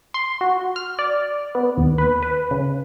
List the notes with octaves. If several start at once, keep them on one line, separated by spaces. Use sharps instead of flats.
C6
F#4
F6
D5
B3
D#2
B4
B4
C#3